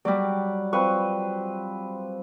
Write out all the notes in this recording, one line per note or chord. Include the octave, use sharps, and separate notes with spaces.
F#3 G3 D5
F3 C4 B4 C#6